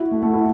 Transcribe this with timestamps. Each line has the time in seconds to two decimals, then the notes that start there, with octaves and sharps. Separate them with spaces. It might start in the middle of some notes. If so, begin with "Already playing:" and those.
Already playing: E4 F#4
0.11 A3
0.23 A3
0.33 E4